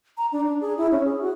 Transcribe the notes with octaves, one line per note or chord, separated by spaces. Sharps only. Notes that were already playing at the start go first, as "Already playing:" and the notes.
A#5
D4
D4
G#4
E4
C#4
G#4
F#4